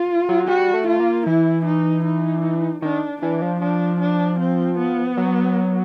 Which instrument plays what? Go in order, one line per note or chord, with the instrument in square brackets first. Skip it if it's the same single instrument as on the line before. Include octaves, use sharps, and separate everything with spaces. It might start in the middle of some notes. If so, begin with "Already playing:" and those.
Already playing: [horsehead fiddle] F4
[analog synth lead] F#3
[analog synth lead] G3 [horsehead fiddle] F#4
[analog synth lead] A3
[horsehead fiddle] F4
[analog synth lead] A#3
[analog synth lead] E3 [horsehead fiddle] E4
[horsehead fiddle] D#4
D#4
[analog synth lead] D#3 [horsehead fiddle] D4
[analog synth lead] E3 [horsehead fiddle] D4
[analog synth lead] F3
[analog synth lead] F3 [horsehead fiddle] D4
[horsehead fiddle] D4
C4
B3
[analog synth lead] F#3